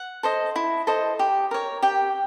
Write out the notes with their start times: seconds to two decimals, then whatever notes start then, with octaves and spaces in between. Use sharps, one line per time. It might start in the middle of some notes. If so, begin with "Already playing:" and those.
Already playing: F#5
0.23 A4 C5 D#5
0.56 E4
0.87 A4 C5 D#5
1.19 G4
1.51 A#4 C#5
1.82 G4 G5